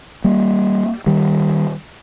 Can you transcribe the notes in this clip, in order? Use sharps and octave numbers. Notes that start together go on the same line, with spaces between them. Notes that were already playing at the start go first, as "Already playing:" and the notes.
G3 A#3
D#3 G3